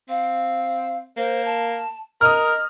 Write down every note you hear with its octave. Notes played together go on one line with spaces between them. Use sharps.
C4 F5
A#3 C5
A5
A#4 D#5 D#6 F6